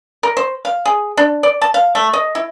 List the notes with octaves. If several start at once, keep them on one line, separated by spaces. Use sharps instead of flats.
A#4
C5
F5
G#4
D4
D5
A5
F5
A3
D#5
E4